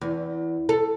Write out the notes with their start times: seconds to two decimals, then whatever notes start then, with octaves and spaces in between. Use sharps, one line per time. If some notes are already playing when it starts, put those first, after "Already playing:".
0.01 E2
0.69 A4